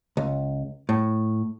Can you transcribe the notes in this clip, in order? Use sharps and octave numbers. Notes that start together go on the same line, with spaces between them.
C#2
A2